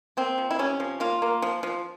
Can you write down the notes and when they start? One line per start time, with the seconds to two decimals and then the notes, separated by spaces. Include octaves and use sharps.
0.17 A#3 C4
0.38 F3
0.51 E4
0.59 C3 C#4
0.80 F3
1.00 A#3 F4
1.22 A#3
1.42 F3
1.63 F3